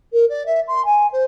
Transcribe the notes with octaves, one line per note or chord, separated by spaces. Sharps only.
A#4
D5
E5
C6
G#5
C5